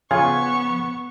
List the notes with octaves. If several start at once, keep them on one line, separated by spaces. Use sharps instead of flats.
C#3 F3 B3 F4 G#5 C#6